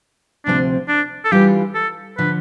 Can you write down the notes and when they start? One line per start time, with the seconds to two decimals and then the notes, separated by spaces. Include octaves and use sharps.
0.46 D2 C3 F3 C4 D4
0.88 D4
1.25 A4
1.32 E3 G3 D4 F4 G4
1.75 A4
2.18 D3 F3 B4